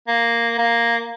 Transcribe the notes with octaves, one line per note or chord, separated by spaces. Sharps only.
A#3
A#3